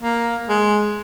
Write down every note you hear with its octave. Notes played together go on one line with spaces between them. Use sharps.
A#3
G#3